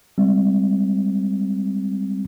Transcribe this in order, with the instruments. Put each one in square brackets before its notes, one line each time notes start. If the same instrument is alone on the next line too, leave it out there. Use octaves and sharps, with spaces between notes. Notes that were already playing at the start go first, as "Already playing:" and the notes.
[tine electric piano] G3 G#3 C4